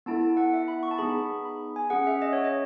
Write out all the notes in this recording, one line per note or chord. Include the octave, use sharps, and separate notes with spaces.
B3 E4 A4 A5
F#5
E5
B5
C#6
A5
B3 D#4 G#4 B5
B5
G#5
C#4 G#4 F#5
E5
D#5
C#5
D#5